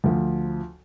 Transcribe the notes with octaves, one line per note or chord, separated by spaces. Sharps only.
D2 F3